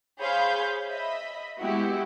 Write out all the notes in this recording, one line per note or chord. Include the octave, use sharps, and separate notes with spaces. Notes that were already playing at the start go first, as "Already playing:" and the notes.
G#4 C5 C#5 F5 B5 G6
D#5 E5 B5
G#3 B3 E4 F#4 G4